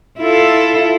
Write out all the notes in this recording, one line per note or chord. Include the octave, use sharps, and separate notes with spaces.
E4 F4 A4